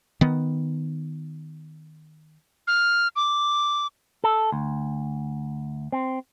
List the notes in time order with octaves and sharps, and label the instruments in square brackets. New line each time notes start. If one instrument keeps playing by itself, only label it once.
[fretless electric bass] D#3 B3
[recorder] F6
D6
[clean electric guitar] A4
D2
C4